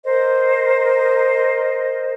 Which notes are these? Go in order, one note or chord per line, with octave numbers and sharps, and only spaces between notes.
A#4 C5 D#5